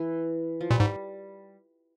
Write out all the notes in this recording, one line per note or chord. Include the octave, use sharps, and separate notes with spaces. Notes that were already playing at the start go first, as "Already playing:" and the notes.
Already playing: E3
F3
A#2 G3
G#2